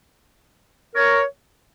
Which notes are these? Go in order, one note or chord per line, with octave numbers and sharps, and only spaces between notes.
A#4 C#5